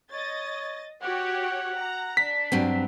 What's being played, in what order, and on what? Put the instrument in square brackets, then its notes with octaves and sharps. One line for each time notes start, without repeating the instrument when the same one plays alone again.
[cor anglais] C#5 [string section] D#5 A6
[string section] F#4 G4 C#5 [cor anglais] F#5
[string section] A#5
[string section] D4 [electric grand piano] B6
[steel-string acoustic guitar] G2 F#3 C4